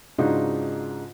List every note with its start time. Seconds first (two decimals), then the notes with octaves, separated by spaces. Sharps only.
0.18 G#2 C#3 D4 D#4 F4 F#4